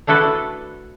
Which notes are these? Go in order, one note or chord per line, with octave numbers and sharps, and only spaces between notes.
A3 D4 E4 F#4 A4 B4